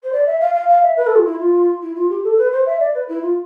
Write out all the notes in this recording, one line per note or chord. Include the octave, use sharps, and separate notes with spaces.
C5
D5
E5
F5
F5
F5
E5
B4
A4
F4
E4
F4
E4
F4
G4
A4
B4
C5
E5
D5
B4
E4
F4